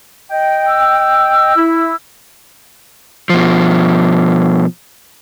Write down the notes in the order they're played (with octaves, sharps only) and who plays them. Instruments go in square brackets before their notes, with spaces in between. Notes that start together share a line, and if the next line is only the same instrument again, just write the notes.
[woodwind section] D#5 G5
[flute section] E6
[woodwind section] E4
[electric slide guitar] B2 F3